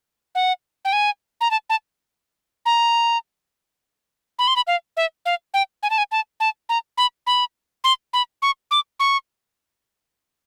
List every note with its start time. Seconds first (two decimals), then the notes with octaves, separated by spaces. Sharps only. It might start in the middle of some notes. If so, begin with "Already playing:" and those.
0.35 F#5
0.85 G5
0.93 G#5
1.41 A#5
1.51 A5
1.70 A5
2.66 A#5
4.39 B5
4.48 C6
4.56 B5
4.67 F5
4.97 E5
5.26 F5
5.54 G5
5.83 G#5
5.90 A5
5.98 G#5
6.12 A5
6.40 A5
6.69 A#5
6.98 B5
7.27 B5
7.84 C6
8.13 B5
8.42 C#6
8.71 D6
9.00 C#6